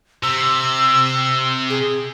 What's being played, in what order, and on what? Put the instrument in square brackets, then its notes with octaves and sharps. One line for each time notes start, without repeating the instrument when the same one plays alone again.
[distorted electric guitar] C3 [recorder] E6
[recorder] G#4